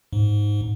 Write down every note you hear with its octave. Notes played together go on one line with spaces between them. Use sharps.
G#2